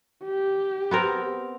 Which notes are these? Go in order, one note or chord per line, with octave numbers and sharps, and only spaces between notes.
G4
B3 C4 A#4